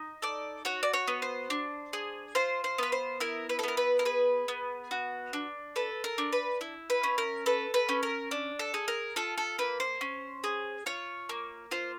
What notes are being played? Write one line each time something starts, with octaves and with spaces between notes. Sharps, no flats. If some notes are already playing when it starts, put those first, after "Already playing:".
Already playing: D#4
A4 D5
F#4 C#5
D5
C#5
B3
C5
D4
G#4
F4 C5
C5
B3 B4
C5
E4 A#4
B4
A4
B3 A#4
B4
A#4
G#4 B4
B3
F#4
D4
A4 B4
A#4
D4
B4
E4
B4
C#4
A#4
A4 B4
B4
C#4
A#4
D4
A4
G#4
A#4
F4 A4
A4
A#3 B4
C5
C#4
G#4
F4 C#5
A#3
F4 C5